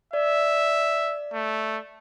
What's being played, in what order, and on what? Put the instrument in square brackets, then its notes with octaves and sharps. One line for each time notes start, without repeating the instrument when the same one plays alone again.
[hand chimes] D5 [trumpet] E5
[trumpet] A3